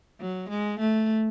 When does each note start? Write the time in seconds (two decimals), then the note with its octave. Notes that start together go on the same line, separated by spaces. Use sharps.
0.20 F#3
0.49 G#3
0.80 A3